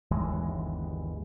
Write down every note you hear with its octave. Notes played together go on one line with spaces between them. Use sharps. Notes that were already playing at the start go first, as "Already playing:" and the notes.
G1 D#2 E3 G#3